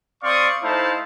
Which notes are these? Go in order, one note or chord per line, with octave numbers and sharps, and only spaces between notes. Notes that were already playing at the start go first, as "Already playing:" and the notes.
C4 D5 F5 C6 C#6 D#6
A3 D#4 E4 C5 F5 A5